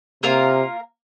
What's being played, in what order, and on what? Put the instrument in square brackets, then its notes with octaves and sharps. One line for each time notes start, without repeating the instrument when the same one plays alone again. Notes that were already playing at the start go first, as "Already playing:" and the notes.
[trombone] C3 [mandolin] A#3 F4 A#4 F5